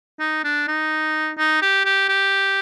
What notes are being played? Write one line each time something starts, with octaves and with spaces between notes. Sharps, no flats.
D#4
D4
D#4
D#4
G4
G4
G4